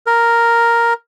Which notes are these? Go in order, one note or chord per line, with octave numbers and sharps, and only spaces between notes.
A#4